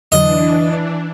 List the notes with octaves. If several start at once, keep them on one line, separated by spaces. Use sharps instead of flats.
F2 D3 E3 F#3 D4 D#5